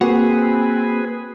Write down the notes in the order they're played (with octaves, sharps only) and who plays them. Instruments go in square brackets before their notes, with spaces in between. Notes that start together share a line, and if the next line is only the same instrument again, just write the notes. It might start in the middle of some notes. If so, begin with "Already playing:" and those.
[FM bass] A#3 [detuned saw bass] C4 [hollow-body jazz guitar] F#4 [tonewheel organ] G#4 B4